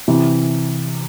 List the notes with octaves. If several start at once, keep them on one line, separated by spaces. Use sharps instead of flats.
C3 E3